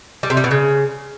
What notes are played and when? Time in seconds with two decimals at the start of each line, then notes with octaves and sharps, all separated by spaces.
0.23 G3
0.30 C3
0.37 G3
0.44 B2
0.51 C#3